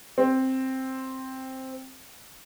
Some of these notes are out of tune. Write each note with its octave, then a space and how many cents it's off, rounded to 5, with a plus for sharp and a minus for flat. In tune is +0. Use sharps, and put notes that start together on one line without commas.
C4 +5